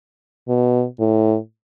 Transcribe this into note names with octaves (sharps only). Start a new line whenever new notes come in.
B2
A2